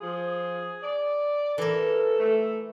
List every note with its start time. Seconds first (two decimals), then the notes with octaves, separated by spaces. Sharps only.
0.01 F3 G#4
0.82 D5
1.58 E3 A4 A#4
2.18 A3